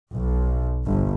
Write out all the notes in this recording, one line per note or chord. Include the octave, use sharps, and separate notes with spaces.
B1
G1